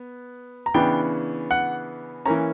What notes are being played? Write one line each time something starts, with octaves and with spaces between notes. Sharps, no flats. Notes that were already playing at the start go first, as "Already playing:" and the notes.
Already playing: B3
A#5
C#3 E3 B3 D4 G5
F#5
E3 A#3 C#4 A#5